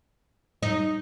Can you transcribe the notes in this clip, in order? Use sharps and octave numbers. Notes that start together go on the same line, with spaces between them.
D#4